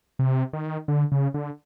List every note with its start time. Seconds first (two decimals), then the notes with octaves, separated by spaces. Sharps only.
0.19 C3
0.53 D#3
0.88 D3
1.12 C#3
1.34 D3